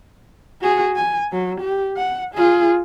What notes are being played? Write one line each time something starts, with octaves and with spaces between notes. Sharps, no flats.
F#4 G#4
G#5
F#3
G4
F#5
F4 G#4